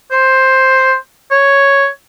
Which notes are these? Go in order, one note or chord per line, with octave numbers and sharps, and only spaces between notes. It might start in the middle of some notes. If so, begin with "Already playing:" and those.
C5
C#5